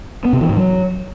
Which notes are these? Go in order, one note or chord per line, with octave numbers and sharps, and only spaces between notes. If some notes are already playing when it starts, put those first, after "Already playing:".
B3
C3
E3
G#2
F#3